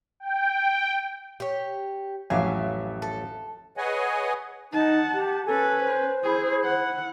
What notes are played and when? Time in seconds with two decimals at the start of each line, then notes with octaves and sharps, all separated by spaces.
0.20 G5
1.40 G4 C#5
2.30 A1 F2 F#3 E5 F5 G#5 D6
3.02 A4
3.77 G#4 B4 C#5 D#5 F#5 G#5
4.73 D#4 F#5 A5
5.14 G4
5.46 C#4 A4 B4 G#5
5.80 C5
6.24 E4 G#4
6.65 F#5